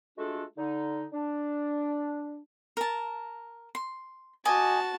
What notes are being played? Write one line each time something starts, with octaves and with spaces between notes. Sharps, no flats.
G#3 A3 D4 F4 F#4 A4
D3 D#4
D4
A#4 A5
C6
F#4 D#5 G#5 A5 D6